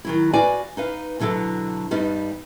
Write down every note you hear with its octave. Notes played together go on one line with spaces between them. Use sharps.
D#3 F#3 E4
F#4 B4 D5 F5 G#5
D#4 B4 F5
B2 D3 F#3 E4 A4
G2 G3 B3 D#4